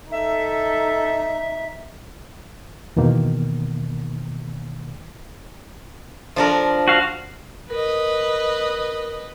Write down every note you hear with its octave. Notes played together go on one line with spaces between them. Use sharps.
D#4 A4 E5
E2 B2 D#3 A#3
F3 D4 A#4
F#4 F5
A#4 B4 D#5